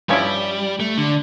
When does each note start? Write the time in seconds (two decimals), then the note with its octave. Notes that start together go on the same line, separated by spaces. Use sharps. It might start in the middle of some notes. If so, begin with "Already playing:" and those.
0.09 G2 F3 G3 C#4 E4
0.80 A3
0.98 D3